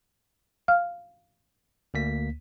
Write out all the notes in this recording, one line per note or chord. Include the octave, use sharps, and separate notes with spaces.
F5 F6
D2 A#3 B6